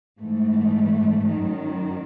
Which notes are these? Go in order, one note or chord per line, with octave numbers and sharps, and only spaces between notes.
G#2 E3 A3
F#2 D#3 F#3